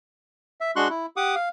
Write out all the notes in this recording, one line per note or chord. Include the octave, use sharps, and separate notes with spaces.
E5
G#3 D4 F#4 C6 C#6 F#6
E4
G4 F#5 D6 D#6
F5